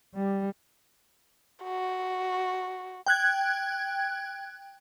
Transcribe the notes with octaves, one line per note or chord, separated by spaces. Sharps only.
G3
F#4
G5 F#6 G#6